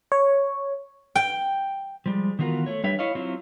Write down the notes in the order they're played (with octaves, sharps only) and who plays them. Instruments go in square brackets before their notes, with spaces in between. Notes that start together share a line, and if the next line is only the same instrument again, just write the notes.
[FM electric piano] C#5
[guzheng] G5
[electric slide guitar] F3 G3 G#3
D#3 E3 B3 F4 F#4 A#4
A3 C#5
G3 D4 B4 C#5 E5 G5
E4 C#5 D#5 F5
F#3 C4 E4 F4 C#5